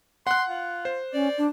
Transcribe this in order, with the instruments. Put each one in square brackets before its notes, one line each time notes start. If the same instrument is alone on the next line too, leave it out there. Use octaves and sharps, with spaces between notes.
[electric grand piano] F#5 F#6 [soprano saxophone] C6
[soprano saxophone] F4
[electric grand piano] C5
[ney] C#4 [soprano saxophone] D5
[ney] D4